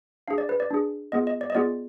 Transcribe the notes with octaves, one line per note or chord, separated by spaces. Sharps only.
D4 G#4 F5
D5
B4
D5
D4 G#4
B3 F4 G#4 D#5
D#5
D5
D#5
B3 F4 G#4 D5